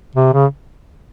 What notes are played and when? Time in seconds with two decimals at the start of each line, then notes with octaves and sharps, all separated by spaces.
0.16 C3
0.33 C#3